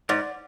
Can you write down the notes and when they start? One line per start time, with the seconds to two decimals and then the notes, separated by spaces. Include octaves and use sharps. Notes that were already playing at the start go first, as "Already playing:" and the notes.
0.09 G#2 D5